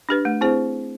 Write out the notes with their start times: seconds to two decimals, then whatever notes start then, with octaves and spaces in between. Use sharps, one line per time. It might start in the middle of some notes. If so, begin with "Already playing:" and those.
0.09 D4 G4 B4
0.25 A3
0.41 C4 E4 G#4 C5